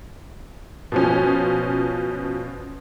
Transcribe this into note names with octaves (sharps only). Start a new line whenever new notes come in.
B2 F3 C#4